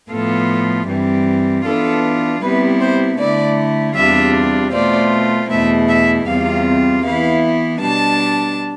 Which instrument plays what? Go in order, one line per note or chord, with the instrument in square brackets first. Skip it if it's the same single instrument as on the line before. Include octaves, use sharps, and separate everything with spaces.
[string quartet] A2 F3 B3 F4 A4
G2 E3 G3 C4
E3 B3 D4 F4 A4
C3 G3 B3 E4 B4
C5
D3 A3 E4 D5
E2 C3 G3 D4 F4 E5
B2 A3 C4 F4 D5
E2 B2 A3 E4 E5
E5
E2 C3 G3 C4 F4 F5
E3 B3 E4 F5
B2 G3 D4 A5